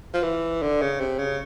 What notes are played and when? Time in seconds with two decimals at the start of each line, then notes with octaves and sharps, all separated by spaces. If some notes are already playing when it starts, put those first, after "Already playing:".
0.14 F3
0.23 E3
0.62 D3
0.82 C#3
1.00 C3
1.19 C#3